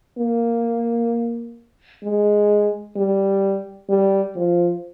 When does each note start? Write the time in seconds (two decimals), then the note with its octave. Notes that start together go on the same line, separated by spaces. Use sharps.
0.18 A#3
2.04 G#3
2.97 G3
3.90 G3
4.36 F3